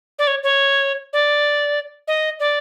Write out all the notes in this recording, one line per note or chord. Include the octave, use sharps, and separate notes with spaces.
D5
C#5
C#5
D5
D#5
D5